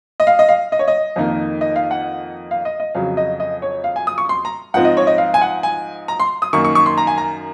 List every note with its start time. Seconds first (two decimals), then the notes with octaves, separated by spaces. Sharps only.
0.20 D#5
0.27 F5
0.39 D#5
0.49 F5
0.72 D#5
0.79 C#5
0.88 D#5
1.16 F2 D#3 A#3 D#4
1.61 D#5
1.76 F5
1.91 F#5
2.51 F5
2.65 D#5
2.80 D#5
2.95 F2 C#3 F#3 F5
3.17 D#5
3.40 D#5
3.62 C#5
3.84 F5
3.96 G#5
4.07 D#6
4.18 C#6
4.29 C6
4.45 A#5
4.74 G#2 F3 C4 F4 F#5
4.85 D#5
4.97 C#5
5.07 D#5
5.18 F5
5.34 G#5
5.41 F#5
5.63 G#5
6.08 A#5
6.20 C6
6.42 D#6
6.53 F#2 D#3 A#3 D#4 C#6
6.65 C#6
6.75 C#6
6.86 C6
6.98 A#5
7.07 G#5
7.18 A#5